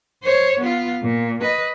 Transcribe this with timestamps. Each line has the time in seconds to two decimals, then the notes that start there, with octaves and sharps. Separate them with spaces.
0.23 C5 C#5
0.60 B3 F4
1.03 A#2
1.41 B4 D#5